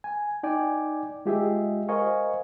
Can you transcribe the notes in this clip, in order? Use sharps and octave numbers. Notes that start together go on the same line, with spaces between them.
G#5
D#4 D5 G5 G#5 D6
G#3 F4 G4 G#4 D#5 E5
A#4 C5 D#5 F5 G#5 C#6